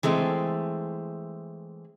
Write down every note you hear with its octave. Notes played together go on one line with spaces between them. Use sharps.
E3 G#3 A3 C4